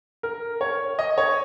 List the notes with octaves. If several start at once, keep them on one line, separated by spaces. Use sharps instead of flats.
A#4
C#5
D#5
C#5